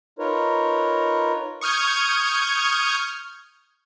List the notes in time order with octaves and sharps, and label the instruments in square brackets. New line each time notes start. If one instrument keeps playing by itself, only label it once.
[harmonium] D#4 F4 A#4 B4 C#5
[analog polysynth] C#6 D#6 F6 G6 G#6